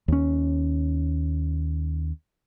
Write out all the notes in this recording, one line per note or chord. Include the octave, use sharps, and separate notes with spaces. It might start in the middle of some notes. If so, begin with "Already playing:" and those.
D#2 C#4